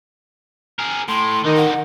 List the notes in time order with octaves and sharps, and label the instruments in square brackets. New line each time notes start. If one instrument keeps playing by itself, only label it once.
[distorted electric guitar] G#4 A#4
[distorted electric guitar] A2 [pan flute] C6
[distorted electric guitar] D3 D#4 [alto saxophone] D#3
[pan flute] F#5